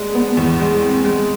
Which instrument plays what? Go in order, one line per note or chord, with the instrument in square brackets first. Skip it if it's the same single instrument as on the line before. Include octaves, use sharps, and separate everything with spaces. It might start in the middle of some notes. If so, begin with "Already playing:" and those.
Already playing: [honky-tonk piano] G#3 D4
B3
E2
G#3
C4
G#3